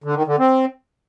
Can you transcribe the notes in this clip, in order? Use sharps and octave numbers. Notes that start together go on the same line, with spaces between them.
D3
D#3
D3
C4